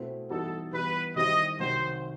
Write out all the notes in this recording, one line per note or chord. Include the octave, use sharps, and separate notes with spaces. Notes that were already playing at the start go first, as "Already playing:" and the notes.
Already playing: B2 A3 C4 E4
E3 G3 B3 D#4 F#4 A4
E3 G3 B3 B4
D#3 G3 C4 E4 D#5
C2 C3 D#3 F#3 C4 C5